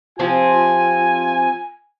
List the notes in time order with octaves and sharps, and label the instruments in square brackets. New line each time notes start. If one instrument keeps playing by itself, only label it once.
[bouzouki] C3 F3 C4 [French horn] F4 [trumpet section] G#5